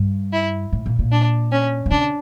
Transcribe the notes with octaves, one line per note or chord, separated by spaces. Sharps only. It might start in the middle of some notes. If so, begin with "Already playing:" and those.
Already playing: G2
E4
A2
A#2
A#2
D4
C#4
A#2
C#3 D4